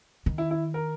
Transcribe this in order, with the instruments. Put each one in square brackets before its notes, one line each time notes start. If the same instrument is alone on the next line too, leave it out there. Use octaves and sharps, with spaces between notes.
[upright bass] D#3
[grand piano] E4
E4
A#4